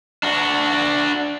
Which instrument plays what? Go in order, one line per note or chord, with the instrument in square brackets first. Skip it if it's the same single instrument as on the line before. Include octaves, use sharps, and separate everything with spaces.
[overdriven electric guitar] D4 F#4